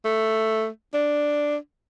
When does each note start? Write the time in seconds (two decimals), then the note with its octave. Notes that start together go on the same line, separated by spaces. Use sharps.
0.05 A3
0.94 D4